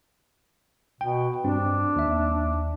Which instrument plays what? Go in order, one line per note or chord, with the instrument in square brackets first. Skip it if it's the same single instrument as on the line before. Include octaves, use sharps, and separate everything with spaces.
[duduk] B2 [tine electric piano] G5
[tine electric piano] G2 C4 [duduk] D4
[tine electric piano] D#2 E5